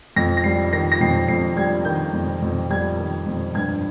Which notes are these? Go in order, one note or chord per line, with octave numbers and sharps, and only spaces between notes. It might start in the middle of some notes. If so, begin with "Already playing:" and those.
F2 A#6
A#6
G3 C7
D#3 A#6
A#6
F2 C7
F2 C7
G3 G#6
D#3 G6
F2
F2
G3 G#6
D#3
F2
G2 G#6